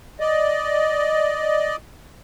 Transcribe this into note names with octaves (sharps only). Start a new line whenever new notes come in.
D5 D#5